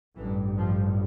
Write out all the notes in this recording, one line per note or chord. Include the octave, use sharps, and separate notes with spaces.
A1 G2 E3
F3